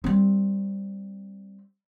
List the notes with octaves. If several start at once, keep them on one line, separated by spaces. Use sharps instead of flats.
G3 C4